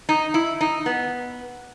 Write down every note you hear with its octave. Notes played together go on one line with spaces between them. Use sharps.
D#4
E4
D#4
B3